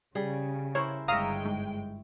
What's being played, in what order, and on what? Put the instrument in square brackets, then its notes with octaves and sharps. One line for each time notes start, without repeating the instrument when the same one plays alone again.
[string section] C#3 [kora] G3 G#4
[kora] E4 A#4 C5 [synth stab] C#5
[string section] G1 G#3 G5 [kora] C#5 E5 [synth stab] F5 A#5 D#6
[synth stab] G#2